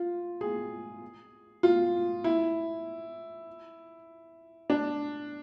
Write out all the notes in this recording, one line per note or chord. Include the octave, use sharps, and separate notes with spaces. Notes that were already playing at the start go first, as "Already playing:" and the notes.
Already playing: F4
G#4
F4
E4
D4